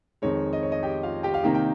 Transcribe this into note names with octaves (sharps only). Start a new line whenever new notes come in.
F2 D#3 G#3 C#5
D#5
C#5
D#5
G4 G5
F4 F5
G4 G5
F5
C3 D#3 A#3 D#4 G4 G5
G5